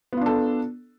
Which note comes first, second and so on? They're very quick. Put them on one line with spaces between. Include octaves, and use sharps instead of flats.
B3 F4 D4 A4